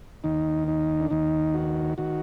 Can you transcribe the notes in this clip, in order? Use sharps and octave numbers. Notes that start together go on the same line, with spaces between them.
D#2 D#3 D#4
D#4
D4
D#2 D#3 D#4
F#4
D#3 F#4